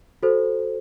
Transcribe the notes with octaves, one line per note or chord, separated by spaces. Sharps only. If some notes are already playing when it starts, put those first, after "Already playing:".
F#4 A4 C5